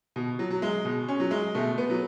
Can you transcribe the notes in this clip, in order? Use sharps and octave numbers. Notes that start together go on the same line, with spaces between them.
B2
F#3
F#3
G#3
B2
C#4
F#3
G#3
B2 A3
B3
F#3